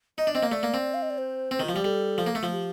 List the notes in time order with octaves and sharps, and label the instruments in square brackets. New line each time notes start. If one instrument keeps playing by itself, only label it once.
[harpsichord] D#4 [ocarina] D#5
[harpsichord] D4
[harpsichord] C4 [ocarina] D#5
[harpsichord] A#3
[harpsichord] A3 [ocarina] D5
[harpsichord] A#3
C4
[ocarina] F5
D#5
D5
C5
[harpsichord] C4
[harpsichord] D#3 [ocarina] F4
[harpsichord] F3
[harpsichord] G3 [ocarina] G4
[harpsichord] G3 [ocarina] A4
[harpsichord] F3
A#3
A3
F3
[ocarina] G4